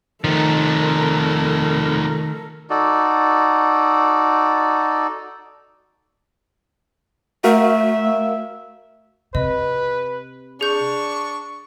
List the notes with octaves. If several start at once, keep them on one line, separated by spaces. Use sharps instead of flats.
D#3 F3 A3 A4 A#4
D#4 F#4 A4 D5
A3 F#4 A#4 E5 F5
C3 B4 D#5
D4 G#4 C#6 G6